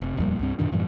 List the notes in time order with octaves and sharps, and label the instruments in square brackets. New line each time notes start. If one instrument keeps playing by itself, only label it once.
[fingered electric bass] F1 C3
D#1 F2 A#2 G3
C2 G2 C4
F#2 A#2 D#3 D4
F#2 A2 E3 G3